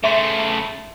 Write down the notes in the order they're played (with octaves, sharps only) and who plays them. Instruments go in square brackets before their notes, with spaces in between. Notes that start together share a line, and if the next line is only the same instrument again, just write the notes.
[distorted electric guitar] C#3 A3 [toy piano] E5 C6